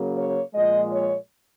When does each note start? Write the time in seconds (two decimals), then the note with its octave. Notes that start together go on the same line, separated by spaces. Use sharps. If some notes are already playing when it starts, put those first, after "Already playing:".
Already playing: C#3 F#3 A#3
0.17 C#5
0.54 A#2 F3 G#3 D#5
0.92 C#5